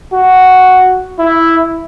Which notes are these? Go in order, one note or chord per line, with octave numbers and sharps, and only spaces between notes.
F#4
E4